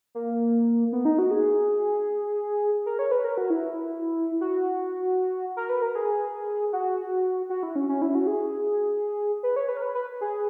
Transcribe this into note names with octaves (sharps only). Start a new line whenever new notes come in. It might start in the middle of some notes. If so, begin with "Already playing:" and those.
A#3
B3
D#4
F#4
G#4
A#4
C#5
B4
A#4
F#4
E4
F#4
A#4
B4
A#4
G#4
F#4
F#4
E4
C#4
C#4
E4
F#4
G#4
B4
C#5
B4
A#4
B4
B4
G#4